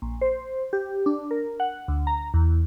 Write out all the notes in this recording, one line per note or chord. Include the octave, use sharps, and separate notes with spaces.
A#1
C5
G4
D4
A#4
F#5
D2
A#5
E2